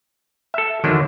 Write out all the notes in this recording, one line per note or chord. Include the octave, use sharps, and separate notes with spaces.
A4 E5
E2 D3 D#3 F#3